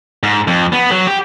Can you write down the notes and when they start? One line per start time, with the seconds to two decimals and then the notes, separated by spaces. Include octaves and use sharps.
0.23 G#2
0.48 F2
0.73 B3
0.91 F#3
1.07 G4